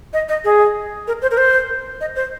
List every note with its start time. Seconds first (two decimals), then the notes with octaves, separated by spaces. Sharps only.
0.13 D#5
0.29 D#5
0.44 G#4
1.07 A#4
1.22 C5
1.31 A#4
1.38 C5
2.01 D#5
2.16 C5